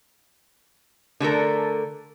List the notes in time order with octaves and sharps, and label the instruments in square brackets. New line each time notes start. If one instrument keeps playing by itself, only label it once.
[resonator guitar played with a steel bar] D3 A3 A4 A#4